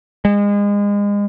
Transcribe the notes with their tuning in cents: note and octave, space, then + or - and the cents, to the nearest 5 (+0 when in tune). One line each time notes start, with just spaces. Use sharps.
G#3 -30